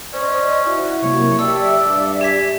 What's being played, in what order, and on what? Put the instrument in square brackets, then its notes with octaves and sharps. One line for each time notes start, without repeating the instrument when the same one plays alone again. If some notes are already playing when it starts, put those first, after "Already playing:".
[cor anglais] C#4 [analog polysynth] C5 D#5 [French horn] D5
[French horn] E4 [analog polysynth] F#4
[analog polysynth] C3 F#3 A#3 [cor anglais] C#5
[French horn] G4 [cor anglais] A4 [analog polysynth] D5 E5 [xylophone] E6
[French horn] G2
[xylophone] G4 B6 [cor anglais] G#5